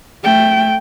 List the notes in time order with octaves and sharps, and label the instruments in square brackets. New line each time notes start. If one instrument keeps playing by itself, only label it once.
[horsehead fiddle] A3 G5